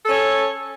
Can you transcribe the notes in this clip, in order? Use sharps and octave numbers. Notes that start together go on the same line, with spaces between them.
C#4 A4 C#5